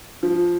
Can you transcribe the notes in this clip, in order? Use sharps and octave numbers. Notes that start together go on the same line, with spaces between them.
F3